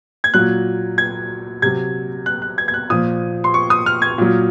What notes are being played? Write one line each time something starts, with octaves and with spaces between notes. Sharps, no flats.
G#6
A#2 F#3 F#6
G#6
C3 F#3 G#6
F#6
F#6
G#6
G#6
F#6
A#2 F3 D#6
C6
C#6
D#6
F6
G#6
A#2 F#3